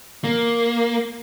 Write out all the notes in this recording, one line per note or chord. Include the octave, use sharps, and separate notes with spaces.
A#3